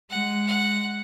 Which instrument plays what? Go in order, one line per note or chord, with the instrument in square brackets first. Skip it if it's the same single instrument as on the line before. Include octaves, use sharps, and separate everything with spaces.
[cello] G#3 [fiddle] F#5
[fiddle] F#5